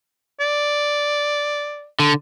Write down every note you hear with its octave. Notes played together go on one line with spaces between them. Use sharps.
D5
D3